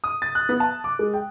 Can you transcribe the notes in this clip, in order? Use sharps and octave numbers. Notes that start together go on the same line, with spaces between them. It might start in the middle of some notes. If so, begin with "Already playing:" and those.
D#6
A6
F#6
B3
A5
D6
G#3
G5